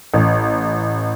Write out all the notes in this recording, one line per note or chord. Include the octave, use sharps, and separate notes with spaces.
A1